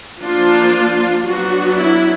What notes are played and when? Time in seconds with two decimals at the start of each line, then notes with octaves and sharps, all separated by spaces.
0.22 F3 A#3 D4 F4
1.25 F#3 B3 D4 F#4
1.77 E4